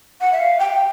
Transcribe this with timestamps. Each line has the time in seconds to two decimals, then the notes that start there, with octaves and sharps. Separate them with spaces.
0.21 F#5
0.32 E5
0.39 F5
0.59 G5